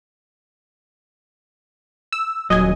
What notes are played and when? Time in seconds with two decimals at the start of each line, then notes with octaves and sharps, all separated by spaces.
2.12 E6
2.50 D#1 F#3 D#5 G#5